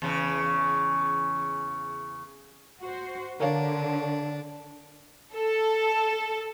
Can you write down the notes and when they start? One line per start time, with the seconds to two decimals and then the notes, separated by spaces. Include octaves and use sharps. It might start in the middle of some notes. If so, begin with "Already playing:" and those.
0.02 E2 C#3
2.80 F#4 C5
3.40 D3 D4 A#4 C#5 F5
5.34 A4